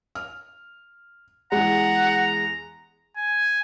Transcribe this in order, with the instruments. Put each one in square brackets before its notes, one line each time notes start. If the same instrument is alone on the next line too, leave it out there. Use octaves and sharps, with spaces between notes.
[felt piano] F6
[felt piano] E2 G#3 [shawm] F#5 [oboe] A#5
[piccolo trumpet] G#5